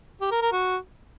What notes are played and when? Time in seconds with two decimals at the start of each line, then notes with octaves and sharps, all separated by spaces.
0.21 G4
0.31 A#4
0.42 A#4
0.52 F#4